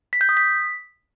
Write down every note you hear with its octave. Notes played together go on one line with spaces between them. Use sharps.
B6
G6
D#6
B6